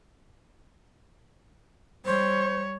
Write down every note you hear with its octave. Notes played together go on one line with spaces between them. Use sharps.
G3 C5 C#5